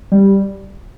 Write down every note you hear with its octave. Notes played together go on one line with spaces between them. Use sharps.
G3